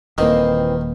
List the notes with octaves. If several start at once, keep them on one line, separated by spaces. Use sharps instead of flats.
D#1 D#3 E3 A#3 C4